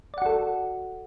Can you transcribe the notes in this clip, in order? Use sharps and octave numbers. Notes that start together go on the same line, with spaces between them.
F#4 A4 D5 F#5